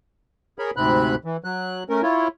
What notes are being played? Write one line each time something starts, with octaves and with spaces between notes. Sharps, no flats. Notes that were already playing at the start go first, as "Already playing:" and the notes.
G#4 A#4 C#5 B5
D2 G#2 C3 C4 B5 F#6
E3
F#3 F#6
A3 C#4 A#4
E4 F4 C#5